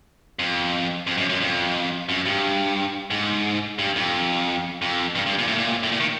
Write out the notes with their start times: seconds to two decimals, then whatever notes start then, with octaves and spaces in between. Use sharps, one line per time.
0.39 F2
1.07 F2
1.17 F#2
1.29 F#2
1.41 F2
2.09 F#2
2.26 G2
3.10 G#2
3.79 G2
3.96 F2
4.82 F2
5.15 G2
5.26 G2
5.38 A#2
5.48 A2
5.58 A#2
5.83 A2
5.92 A#2
6.00 D#3